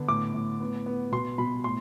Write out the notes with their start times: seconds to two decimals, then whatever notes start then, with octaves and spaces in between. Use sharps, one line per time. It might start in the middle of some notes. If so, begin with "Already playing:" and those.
Already playing: D3 B3
0.08 A2 D6
0.34 A2
0.60 B3
0.86 B3
1.12 B2 C6
1.38 B2 B5
1.64 A2 C6